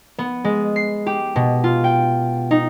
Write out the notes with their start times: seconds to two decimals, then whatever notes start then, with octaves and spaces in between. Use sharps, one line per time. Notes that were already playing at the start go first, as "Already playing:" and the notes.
0.19 B3
0.44 G#3
0.76 C7
1.06 G4
1.36 B2
1.64 F4
1.84 G5
2.51 D#4